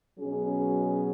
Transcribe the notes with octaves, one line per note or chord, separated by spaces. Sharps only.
B2 F#3 C#4 G#4